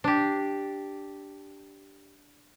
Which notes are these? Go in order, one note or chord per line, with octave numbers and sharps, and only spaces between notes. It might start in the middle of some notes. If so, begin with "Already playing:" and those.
D4 G4